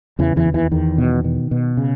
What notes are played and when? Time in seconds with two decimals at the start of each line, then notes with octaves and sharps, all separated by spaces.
0.19 E2 C#3 E3
0.36 E2 E3
0.45 D#2
0.54 E2 E3
0.71 E2 D#3
0.98 B2
1.24 B2
1.51 B2
1.77 C#3